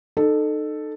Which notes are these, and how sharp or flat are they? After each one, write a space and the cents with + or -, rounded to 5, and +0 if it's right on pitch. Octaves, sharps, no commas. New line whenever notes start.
D#4 -30 A4 +0